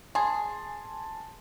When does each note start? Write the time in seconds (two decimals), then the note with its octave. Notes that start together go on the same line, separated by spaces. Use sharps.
0.15 G#4 G#5 A5 C6